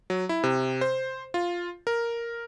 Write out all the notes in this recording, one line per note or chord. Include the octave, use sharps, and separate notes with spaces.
F#3
E4
C3
C5
F4
A#4